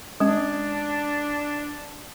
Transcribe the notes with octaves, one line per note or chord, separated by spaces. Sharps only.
G#3 C#4 D4